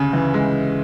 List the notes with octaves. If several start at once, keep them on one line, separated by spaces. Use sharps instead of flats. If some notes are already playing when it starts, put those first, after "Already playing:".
Already playing: D2 C#3
E3
G#3